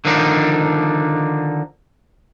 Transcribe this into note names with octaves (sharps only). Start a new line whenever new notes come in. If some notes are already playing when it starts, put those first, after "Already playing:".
D3 D#3 F3 D4 D#4